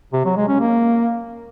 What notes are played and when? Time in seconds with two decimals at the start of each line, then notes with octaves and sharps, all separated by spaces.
0.13 C3
0.25 F#3
0.36 G#3
0.48 C#4
0.60 A#3